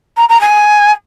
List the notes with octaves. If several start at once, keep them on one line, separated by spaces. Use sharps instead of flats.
A#5
A#5
G#5